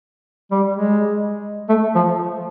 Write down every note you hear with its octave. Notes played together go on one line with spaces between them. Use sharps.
G3
G#3
A3
F3